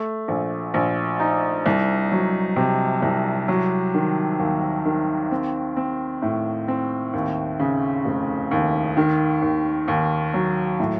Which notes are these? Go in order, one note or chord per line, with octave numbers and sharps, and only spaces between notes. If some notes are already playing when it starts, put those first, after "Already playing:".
Already playing: A3
A#1
A#1
D#4
C2
F#3
C3
C2
F#3
D#3
D#2
D#3
C4
C4
A2
C4
D#2
C#3
F1
D#2
D#3
D#2
D#2
F#3
A2